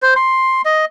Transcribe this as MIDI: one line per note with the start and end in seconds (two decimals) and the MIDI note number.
0.02 0.14 72
0.16 0.62 84
0.65 0.85 75